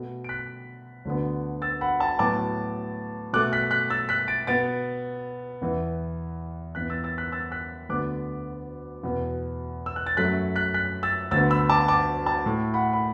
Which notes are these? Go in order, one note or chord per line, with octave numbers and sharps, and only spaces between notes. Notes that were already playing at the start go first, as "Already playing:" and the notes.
Already playing: B2 A3
D7
F#6 B6
D2 D3 B3
E6 A6
F#5 B5
A5
A2 F#3 B3 A5 D6
B2 A3 D6 F#6
F#6 B6
F#6 B6
E6 A6
F#6 B6
A6 D7
B2 B3 A6 D7
E2 E3 B3
E2 E3 B3 F#6 B6
E6 A6
E6 A6
F#6 B6
E6 A6
F#6 B6
D2 D3 B3 D6 F#6
E2 B2 B3
E6
F#6
A6
F#2 F#3 A3 F#6 B6
F#6 B6
F#6 B6
E6 A6
D2 D3 B3 E6 A6
B5 E6
A5 D6
A5 D6
A5
A2 A3
F#5 B5
B5